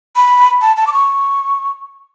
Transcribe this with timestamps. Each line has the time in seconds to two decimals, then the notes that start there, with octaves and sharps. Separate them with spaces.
0.16 B5
0.62 A5
0.76 A5
0.87 D6
0.93 C#6